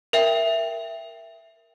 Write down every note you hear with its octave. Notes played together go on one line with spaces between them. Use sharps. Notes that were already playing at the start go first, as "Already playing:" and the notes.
A#4 E5 G5